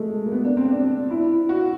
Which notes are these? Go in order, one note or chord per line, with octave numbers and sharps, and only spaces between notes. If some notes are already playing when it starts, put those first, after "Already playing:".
Already playing: G#3 A3
A#3
B3
D4
C4
D4
E4
F#4